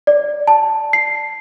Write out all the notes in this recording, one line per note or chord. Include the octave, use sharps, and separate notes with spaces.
D5
A5
C7